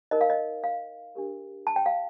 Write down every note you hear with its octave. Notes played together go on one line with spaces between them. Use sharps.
D#4 A#4 D#5
F5
D#5
F5
D4 G4 A#4
A5
G5
F5